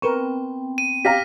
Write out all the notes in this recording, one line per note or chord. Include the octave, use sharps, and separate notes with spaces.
B3 C4 A#4 B4 G5 C#6
D#7
G4 F5 A#5 F6 A#6 B6